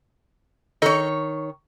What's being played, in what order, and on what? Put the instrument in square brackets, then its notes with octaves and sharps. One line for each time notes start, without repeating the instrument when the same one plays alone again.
[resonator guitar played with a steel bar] D#3 C#5 [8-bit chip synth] A4 D#5